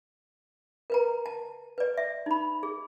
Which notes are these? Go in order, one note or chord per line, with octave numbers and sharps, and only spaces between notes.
A#4 B4 A#5
A5
B4 D5
E5
D#4 B5
G#4